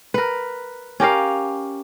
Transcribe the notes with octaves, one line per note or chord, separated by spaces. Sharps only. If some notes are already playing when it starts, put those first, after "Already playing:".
A#4 B4
C#4 G4 A#4 F5